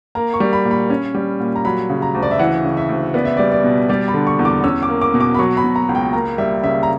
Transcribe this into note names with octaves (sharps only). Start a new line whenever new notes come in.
A#3 A#5
C#6
G3
B5
A#2
B5
C#4
G3
A#2
A#5
F#3 B5
C#3
A#5
D2
D5
E5
E3 F#5
C#3
E5
D2
B3 D5
E5
G3 D5
D5
B2
G3 D5
B5
D3
C#6
E2
D6
C#4 E6
D6
A#3
D6
B2
D6
B5
F#3 C#6
B5
B2
A#5
C#2
G5
A#3 A#5
G3 E5
C#3 E5
A#5